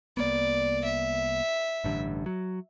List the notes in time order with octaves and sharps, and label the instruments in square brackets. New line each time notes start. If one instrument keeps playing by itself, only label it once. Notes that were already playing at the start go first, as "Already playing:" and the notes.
[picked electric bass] C2 A#3 B3 [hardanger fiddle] D5
[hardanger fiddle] E5
[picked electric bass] A1 G2 D3
F#3